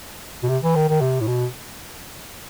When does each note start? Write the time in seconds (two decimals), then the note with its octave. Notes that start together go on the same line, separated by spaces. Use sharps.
0.43 B2
0.49 C3
0.63 E3
0.75 D#3
0.89 D#3
1.01 C3
1.21 A2
1.28 B2